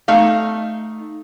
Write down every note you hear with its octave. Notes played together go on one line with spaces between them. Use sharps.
A3 D#4 F5